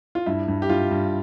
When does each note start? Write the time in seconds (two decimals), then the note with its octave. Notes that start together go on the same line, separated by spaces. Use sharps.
0.15 F4
0.26 G2 E4
0.48 G2
0.62 G4
0.70 G2 F4
0.91 G2